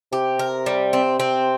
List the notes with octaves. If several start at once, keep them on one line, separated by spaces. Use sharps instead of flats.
C3 G4
A#4
G3
C4
C4